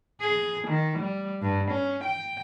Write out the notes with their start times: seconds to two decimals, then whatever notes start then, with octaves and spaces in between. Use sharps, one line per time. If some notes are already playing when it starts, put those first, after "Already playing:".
0.21 G#4
0.68 D#3
0.99 G3
1.42 G2
1.71 C#4
2.04 G5